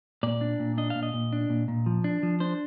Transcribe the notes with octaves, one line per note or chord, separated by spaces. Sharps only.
A#2 D5
D4
A#2
D4 D#5
A#2 F5
D#5
A#2
D4
A#2
A#2
F3
D4
F3
D4 C5